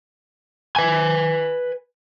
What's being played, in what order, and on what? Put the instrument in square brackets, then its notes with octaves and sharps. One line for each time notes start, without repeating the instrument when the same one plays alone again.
[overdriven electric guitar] B4 G#5